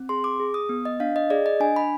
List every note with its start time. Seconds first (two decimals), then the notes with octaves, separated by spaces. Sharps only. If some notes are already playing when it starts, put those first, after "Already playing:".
Already playing: C4
0.09 G#4 C6
0.24 D6
0.40 G#4
0.54 D#6
0.69 B3
0.85 D#5
1.00 D4 F5
1.16 D#5
1.30 G#4 D5
1.46 D#5
1.60 D4 G#5
1.76 B5